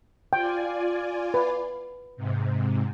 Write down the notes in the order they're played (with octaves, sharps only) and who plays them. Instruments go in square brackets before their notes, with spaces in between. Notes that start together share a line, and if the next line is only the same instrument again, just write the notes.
[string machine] F4 D5 G#5 [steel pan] G5
[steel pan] B4
[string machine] G#2 C3